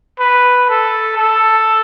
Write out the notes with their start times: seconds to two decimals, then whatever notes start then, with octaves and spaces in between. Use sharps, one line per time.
0.19 B4
0.70 A4
1.18 A4